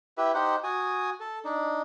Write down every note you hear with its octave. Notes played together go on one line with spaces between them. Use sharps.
E4 G4 B4 E5
D#4 G4 C5 F#5
F#4 G#5 D#6
A4
D4 D#4